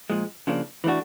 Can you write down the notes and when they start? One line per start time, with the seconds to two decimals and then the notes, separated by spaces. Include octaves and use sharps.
0.10 A#2 F3 G#3
0.47 C#3 F3 A#3 D4
0.84 E3 A3 D4 F#4